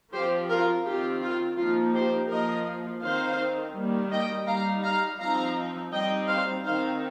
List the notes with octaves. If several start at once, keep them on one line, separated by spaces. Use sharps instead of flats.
F3 C4 F4 G4 C5
F4 A#4
D#3 C4 F4 G4
F4
F3 A#3 D#4 F4
G4 C5
F3 A#3 F4 A#4 D#5
D#3 C4 D#4 C5 F5
D#3 G3 A#3
D#5 G5
G3 D#4 F5 A#5
F5 A#5
F3 C4 D#4 F5 A#5
G3 C4 D#4 D#5 G5
C5 F5
D#3 C4 D#4 C5 F5